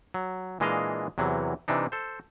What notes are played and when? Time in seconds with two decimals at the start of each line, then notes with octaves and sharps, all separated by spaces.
0.14 F#3
0.60 A#2 E3 G#3 D4 D#5 F5
1.18 E2 C3 E3 F#3
1.68 C3 E3 D4 D#4
1.92 A4 C5